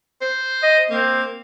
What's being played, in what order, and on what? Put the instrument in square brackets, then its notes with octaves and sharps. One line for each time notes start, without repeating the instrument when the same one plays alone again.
[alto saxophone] C5
[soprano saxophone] D#5
[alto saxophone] A#3 [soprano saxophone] C4